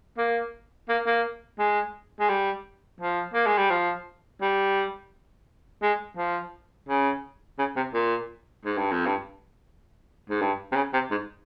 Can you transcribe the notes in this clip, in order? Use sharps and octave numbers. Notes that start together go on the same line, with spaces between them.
A#3
A#3
A#3
G#3
G#3
G3
F3
A#3
G#3
G3
F3
G3
G#3
F3
C#3
C#3
C3
A#2
G#2
G2
F2
G2
G#2
G2
C3
C#3
C3
G#2